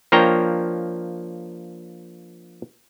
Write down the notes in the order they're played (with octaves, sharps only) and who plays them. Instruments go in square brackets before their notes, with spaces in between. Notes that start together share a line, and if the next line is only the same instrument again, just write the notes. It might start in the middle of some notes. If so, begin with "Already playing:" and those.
[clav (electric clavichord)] F3 A#3 D4 C#5 G5 A#5